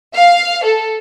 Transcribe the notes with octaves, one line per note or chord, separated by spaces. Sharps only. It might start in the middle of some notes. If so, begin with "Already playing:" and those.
F5
A4